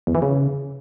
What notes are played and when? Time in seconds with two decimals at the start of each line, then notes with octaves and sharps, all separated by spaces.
0.07 E2
0.15 E3
0.22 C#3